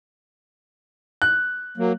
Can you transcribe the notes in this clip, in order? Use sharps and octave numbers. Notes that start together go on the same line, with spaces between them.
F#6
F#3 A#3